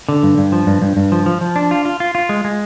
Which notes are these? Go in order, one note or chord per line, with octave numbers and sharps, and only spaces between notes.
D3
G2
G2
F3
G2
G2
G2
F3
F3
F3
D4
F4
F4
F4
F4
G#3
G#3